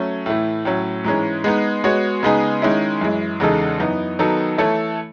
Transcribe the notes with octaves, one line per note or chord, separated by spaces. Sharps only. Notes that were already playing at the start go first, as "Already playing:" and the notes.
Already playing: F#3 A3 C#4
A2 E3 A3
A2 F#3 C#4
G#2 E3 G#3 C#4
G#3 B3 D#4
G#3 B3 F#4 C#5
C#3 G#3 B3 D#4 G#4
D#3 G#3 C#4 E4
F#2 E3 G#3
E2 C#3 G#3 D#4 A4
F#2 E3 B3 D#4
D#3 F#3 B3 D#4 A4
E3 A3 E4 A4 C#5